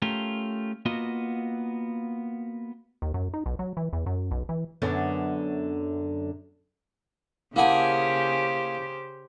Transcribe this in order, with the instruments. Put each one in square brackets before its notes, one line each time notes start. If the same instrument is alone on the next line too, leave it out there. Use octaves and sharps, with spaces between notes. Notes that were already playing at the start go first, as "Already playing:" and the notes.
[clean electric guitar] A3 C#4 F4 G4 A#4
A#3 B3 F4 F#4 D#5
[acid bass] D#2
F#2
D#4
B1
F#3
E3
E2
F#2
B1
E3
[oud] F#2 D3 B3
[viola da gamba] C#3 G4 C5 [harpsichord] A#3 G#4 [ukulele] E4 F#5 A5